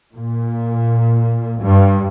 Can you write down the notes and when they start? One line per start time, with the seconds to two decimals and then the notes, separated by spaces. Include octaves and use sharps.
0.14 A#2
1.59 G2